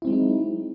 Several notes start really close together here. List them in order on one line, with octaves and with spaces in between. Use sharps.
E4 C4 G#3 F#3 D#4